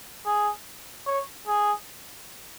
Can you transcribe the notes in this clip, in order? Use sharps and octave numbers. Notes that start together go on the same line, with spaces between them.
G#4
C#5
G#4